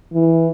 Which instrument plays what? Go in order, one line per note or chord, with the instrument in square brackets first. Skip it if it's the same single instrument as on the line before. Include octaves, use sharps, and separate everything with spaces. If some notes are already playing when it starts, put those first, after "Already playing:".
[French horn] E3